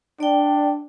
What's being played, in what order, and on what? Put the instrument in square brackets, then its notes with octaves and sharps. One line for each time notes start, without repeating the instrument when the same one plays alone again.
[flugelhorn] D4 [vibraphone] D5 G5